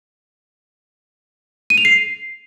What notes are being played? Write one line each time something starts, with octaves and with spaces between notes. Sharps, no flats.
D#7
F7
C7